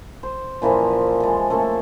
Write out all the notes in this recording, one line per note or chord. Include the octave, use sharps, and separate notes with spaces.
C5
A#2 E3 F3 A#4
G#3 A4
C#3 A3 A#3 A4